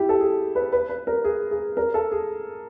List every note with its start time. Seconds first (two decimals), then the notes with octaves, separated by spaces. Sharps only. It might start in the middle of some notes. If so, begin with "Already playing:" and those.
Already playing: E4 G4
0.09 A4
0.20 G#4
0.55 B4
0.72 B4
0.89 B4
1.07 A#4
1.24 G#4
1.51 G#4
1.77 A#4
1.94 A4
2.12 G#4